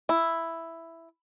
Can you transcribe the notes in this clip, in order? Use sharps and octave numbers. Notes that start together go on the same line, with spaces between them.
E4